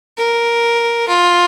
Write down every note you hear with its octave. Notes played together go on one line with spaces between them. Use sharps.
A#4
F4